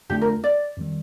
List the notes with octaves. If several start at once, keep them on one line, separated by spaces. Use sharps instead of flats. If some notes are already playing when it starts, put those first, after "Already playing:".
F2 D3 A3 D4 F4 G4
A#4
D5
F2 D#3 G3